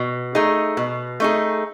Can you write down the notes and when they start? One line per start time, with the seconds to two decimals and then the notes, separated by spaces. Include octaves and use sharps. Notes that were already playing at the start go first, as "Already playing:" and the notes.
Already playing: B2
0.35 A3 D#4 G#4
0.77 B2
1.20 A3 D#4 G#4